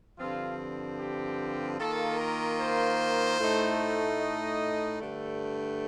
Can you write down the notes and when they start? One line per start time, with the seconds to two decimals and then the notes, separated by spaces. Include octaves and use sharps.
0.19 G2 D3 F3 C4 F4
1.00 G4
1.79 D#3 A#3 F4 A4
2.19 A#4
2.60 C5
3.40 A2 A3 D#4
4.20 D#5
5.00 G2 D3 A3